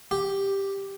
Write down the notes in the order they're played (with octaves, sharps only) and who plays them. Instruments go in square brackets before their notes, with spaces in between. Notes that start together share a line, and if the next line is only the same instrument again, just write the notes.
[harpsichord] G4